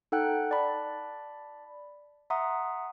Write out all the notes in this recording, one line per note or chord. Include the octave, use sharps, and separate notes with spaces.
D#4 A4 F#5 G5 F#6
D5 A5 B5
E5 F#5 A#5 C6 D#6